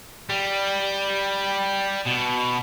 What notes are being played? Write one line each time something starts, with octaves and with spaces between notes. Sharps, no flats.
G3
B2